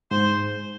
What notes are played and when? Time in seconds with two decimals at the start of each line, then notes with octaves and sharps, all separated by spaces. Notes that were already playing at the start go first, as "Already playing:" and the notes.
0.11 G#2 C5